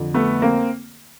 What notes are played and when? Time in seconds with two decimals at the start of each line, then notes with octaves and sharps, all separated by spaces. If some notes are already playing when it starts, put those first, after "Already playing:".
Already playing: F2 D3
0.14 A3 B3
0.42 A#3 C4